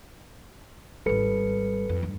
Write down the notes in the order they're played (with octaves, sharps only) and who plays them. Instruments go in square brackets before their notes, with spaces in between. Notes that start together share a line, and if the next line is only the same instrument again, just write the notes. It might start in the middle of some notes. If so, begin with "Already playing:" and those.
[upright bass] G#1 G3 [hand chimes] A4 B4 C#7
[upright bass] F2
G2